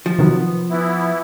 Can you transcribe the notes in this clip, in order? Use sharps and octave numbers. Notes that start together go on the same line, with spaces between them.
F3
C3 D#3 F#3 B3
E3 B3 E4